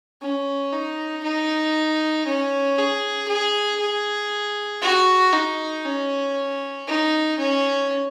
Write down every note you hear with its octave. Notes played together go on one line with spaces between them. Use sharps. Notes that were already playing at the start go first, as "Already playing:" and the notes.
C#4
D#4
D#4
C#4
G#4
G#4
G#4
F#4
D#4
C#4
D#4
C#4